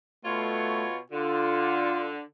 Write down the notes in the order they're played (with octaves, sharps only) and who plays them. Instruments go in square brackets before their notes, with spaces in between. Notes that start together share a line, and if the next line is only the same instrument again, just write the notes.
[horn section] B2 F4 C#5 [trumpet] A3
[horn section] D3 [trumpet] F4